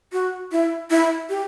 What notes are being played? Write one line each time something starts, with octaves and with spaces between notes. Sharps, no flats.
F#4
E4
E4
G4